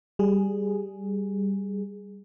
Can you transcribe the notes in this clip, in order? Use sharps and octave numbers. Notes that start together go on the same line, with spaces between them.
G3 G#4